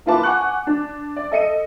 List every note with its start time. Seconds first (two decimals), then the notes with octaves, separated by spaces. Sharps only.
0.06 A#3 E4 F4 B4 A5 D6
0.23 F#5 G#5 C#6 F#6
0.67 D4
1.16 D5
1.31 A4 D#5 C#7 D#7